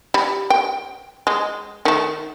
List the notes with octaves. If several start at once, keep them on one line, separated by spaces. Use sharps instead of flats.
G3 B5
G5
G#3
D#3 A3